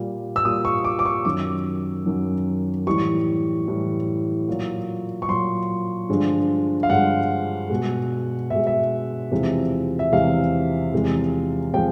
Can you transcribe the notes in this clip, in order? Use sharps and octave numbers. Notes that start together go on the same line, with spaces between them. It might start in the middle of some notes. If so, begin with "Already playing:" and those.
Already playing: A#2 G3
E6
A#2 G3 D#6
C#6
D6
D6
C#6
F#2 D#3 F#3 D6
F#2 D#3 F#3
A2 E3 G3 C#6
A2 E3 G3
A#2 F#3
C#6
A#2 F#3 C6
G2 D3 F3 G#3
F5
G2 D3 F3 G#3 F#5
B2 G#3
B2 G#3 E5
E5
E2 C3 F3 G#3
E5
E2 C3 F3 G#3 F5
E2 C3 F3 G#3
C3 F3 G#3 G5